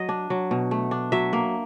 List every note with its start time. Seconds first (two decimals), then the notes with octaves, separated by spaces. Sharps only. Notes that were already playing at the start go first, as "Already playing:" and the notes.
Already playing: F#3 D#5
0.09 D4
0.30 F#3
0.51 B2
0.71 A3
0.91 D4
1.12 F#3 E5
1.33 A#3